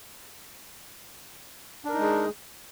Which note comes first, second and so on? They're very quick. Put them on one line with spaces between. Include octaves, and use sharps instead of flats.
D4 A#4 D#4 G#3 G#4